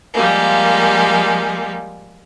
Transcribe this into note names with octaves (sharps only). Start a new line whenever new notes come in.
F3 G3 G#3 A#3